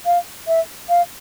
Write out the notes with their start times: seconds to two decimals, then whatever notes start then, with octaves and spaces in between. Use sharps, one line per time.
0.05 F5
0.47 E5
0.89 F5